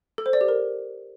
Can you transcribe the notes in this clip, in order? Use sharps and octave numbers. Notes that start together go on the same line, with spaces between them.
A4
C5
D5
G4
A#4